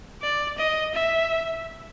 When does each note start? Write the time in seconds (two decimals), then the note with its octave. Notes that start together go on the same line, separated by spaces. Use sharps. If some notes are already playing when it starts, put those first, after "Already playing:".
0.22 D5
0.58 D#5
0.95 E5